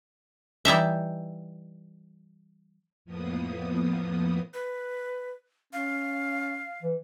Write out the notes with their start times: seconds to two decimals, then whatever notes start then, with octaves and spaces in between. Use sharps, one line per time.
0.65 E3 G3 D#4 E5
3.05 F2 A2 F3 A#3 B3 D#6
4.54 B4
5.73 C#4 F5
6.82 E3